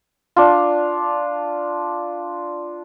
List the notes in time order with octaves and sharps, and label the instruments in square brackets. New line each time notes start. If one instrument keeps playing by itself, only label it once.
[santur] D4 F4